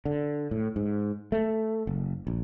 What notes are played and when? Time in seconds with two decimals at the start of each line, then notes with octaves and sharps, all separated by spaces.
0.05 D3
0.51 A2
0.76 G#2
1.32 A3
1.87 F#1
2.27 A#1